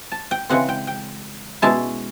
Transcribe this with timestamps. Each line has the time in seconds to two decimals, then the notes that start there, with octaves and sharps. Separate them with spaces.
0.12 A5
0.31 G5
0.50 C#3 E3 G#3 C4 F#5
0.69 G5
0.87 G5
1.62 B2 G#3 C#4 E4 A5